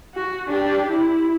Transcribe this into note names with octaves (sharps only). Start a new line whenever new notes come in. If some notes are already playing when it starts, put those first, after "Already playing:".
F#4
D4 G4
E4